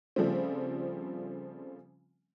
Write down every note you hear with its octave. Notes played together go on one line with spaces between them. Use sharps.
C#3 F3 G3 A3 C4